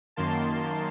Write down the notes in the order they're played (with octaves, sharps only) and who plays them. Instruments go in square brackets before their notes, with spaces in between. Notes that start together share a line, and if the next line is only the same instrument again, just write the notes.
[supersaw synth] F#2 D#3 A#3 A5 C6